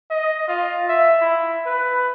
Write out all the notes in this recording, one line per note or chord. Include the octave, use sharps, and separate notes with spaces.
D#5
F4
E5
E4
B4